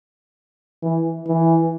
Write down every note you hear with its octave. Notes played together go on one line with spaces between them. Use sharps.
E3
E3